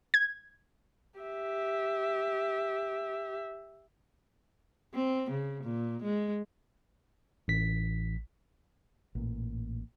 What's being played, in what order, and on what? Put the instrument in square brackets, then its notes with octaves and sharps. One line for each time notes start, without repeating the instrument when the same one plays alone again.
[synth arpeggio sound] G#6
[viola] G4 E5
[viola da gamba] C4
C#3
A#2
G#3
[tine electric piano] A1 B6
[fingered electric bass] A1 A#2